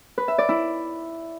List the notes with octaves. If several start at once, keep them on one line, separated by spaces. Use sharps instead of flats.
B4
E5
D5
E4